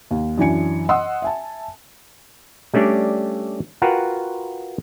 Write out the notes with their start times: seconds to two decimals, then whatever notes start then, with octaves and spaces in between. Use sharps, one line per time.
0.11 D#2
0.38 F#2 E3 D4 G#5 C#7
0.89 D#5 F#5 C6 D#6 E6
1.22 E5 G#5 A5
2.74 G3 A3 C#4 D4 G4 D5
3.82 F4 F#4 A#4 B4 F#5 G5